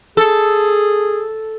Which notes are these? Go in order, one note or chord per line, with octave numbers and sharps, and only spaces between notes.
G#4 A4